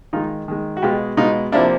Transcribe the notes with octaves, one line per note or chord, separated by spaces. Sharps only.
D#3 G#3 D#4 F4
D#3 G#3
F#4
B2 G#3 F4 G4
B2 G#3 D#4 F4
C3 F3 A#3 D4 E4